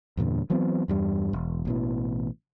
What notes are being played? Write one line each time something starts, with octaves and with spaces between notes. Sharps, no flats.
E2 G2 A#2 D3
E3 F#3 B3 C4
E2 G2 G3
E1
A1 B2 E3